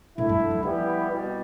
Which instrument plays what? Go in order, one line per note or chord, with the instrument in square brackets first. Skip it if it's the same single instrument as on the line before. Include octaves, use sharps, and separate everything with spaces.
[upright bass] A2 [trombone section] D3 A3 E4
[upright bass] G2
G2
F3
[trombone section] E3 G3 B3 E4 G4 [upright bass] F3
[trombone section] C2 B2 G3